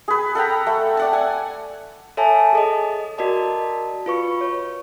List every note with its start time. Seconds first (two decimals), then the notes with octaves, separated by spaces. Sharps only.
0.08 G#4 B4
0.35 A4 F#5 G5 A#5
0.67 A3
0.97 D5 F#5 A5
1.13 G#5
2.17 A4 C#5 E5 G#5 A5
2.53 G#4 A4 D#5
3.18 F#4 A#4 D5 D#5 A5
4.06 F4 B4 C#6
4.41 C#5